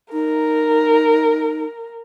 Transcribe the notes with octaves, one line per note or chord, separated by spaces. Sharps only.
D#4 A#4